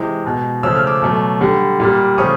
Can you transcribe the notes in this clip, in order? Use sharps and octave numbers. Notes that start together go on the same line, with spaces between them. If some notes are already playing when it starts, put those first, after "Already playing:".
Already playing: C3 E3 G#3
B2 G#3
C#3 F3 A3 E6
F6
D6 E6
B2 F#3 A3
D3 G3
A#2 G3
C#3 F3 A3 C#6 D#6